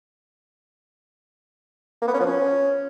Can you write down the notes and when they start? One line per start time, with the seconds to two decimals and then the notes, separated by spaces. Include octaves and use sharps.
2.02 A#3
2.08 B3
2.14 C#4
2.20 F3
2.26 C#4